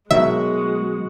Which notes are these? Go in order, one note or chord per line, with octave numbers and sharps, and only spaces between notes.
B2 D#3 F#3 G#3 F#4 E5